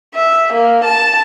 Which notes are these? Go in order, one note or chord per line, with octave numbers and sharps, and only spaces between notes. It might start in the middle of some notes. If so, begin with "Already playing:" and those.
E5
A#3
A5